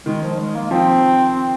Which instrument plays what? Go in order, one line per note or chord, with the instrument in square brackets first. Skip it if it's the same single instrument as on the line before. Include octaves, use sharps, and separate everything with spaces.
[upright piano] D#3 [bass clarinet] G#3
[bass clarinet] F3
G#3
A#3
[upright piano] F3 [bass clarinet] C4
[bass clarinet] C4